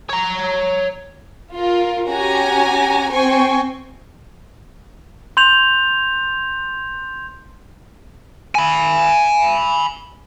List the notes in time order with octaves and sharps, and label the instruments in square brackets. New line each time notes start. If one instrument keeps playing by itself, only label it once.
[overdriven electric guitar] C#5 A#5
[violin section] F4 A#4
C#4 F#4 G4 F#5 G#5 A#5
C4 C5 G5 G#5 C#6
[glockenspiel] C6 G6 F7
[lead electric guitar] G#5 B5